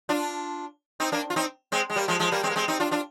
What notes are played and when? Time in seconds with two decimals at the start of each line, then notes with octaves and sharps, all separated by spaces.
0.09 D4 F4
1.00 C4 D#4
1.12 A#3 D4
1.30 F4
1.36 C4 D#4
1.72 G#3 C4
1.90 G#3
1.96 G3 A#3
2.08 F3 G#3
2.19 F3 G#3
2.32 G3 A#3
2.43 G#3 C4
2.50 A#3
2.56 G#3 C4
2.68 C4 D#4
2.80 D4 F4
2.91 D4 F4